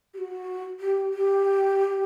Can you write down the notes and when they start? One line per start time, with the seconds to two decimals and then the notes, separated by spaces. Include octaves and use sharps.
0.13 G4
0.17 F#4
0.80 G4
1.13 G4